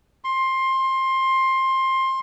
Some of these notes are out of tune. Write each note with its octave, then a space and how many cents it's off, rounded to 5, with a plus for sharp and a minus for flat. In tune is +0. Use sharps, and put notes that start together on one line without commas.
C6 +20